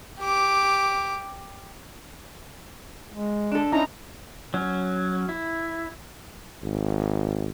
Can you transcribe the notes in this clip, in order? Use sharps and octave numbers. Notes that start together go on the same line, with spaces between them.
G4 D6
G#3
D4 A4
C#4 D#4 E4 A#5
F#3 C#4
E4
G#1